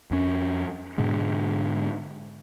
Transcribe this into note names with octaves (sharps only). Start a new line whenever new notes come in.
F2 C#4
G#2 B2 D3 G#3